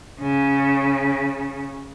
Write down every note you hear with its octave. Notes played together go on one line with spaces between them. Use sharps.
C#3